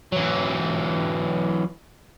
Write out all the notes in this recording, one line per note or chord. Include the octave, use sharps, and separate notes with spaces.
E3 F#3